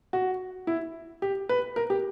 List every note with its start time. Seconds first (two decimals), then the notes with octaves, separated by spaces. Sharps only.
0.13 F#4
0.67 E4
1.22 G4
1.49 B4
1.76 A#4
1.90 G4